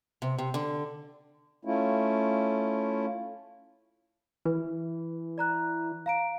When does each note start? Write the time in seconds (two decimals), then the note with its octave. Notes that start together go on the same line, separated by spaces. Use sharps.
0.22 C3
0.38 C3
0.54 D3
1.65 A3 C#4 E4 F4
4.45 E3 B4
5.38 D5 A#5 F#6
6.06 F5 A#5 D7